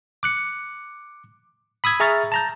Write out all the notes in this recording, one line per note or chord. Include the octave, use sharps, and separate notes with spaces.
D6 F#6 C#7
B5 D#6 E6 G#6
G#4 E5 A#5 C#6 F6 A6
A5 A#5 G6